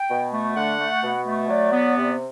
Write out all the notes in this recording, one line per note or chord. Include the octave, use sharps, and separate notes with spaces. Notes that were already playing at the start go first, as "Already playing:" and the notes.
Already playing: G5
B2
A3
D3 F#5
A3
B2
A3
F#3 D5
B3
C3